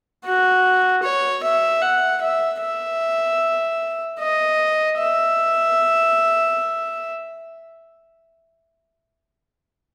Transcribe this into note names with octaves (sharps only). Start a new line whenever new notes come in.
F#4
C#5
E5
F#5
E5
E5
D#5
E5